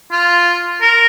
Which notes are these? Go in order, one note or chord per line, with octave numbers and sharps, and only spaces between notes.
F4
A#4